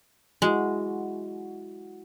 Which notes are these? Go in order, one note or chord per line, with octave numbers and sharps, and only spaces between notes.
G#3 E4 F#4